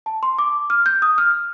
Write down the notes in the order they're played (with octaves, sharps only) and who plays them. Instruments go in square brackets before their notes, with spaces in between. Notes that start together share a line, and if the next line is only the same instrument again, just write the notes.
[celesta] A5
C6
D6
F6
G6
D#6
F6